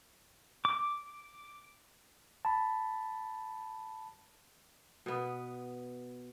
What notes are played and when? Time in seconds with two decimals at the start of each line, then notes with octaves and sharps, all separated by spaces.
0.65 D6
2.45 A5 B5
5.06 B2 B3